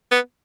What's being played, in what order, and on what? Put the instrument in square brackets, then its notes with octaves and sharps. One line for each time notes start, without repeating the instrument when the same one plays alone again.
[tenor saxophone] B3